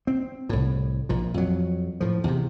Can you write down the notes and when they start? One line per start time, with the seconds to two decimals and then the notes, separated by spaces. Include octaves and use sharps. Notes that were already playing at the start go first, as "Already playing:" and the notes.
0.07 C4
0.49 C2 A2
1.09 A#1 A#2
1.34 F2 F#3
2.00 A2 F3
2.24 E2 C3